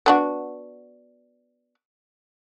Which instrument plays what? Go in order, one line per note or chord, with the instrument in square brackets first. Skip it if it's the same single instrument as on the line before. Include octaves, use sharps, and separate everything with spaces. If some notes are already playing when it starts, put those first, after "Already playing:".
[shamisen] B3 D4 F#4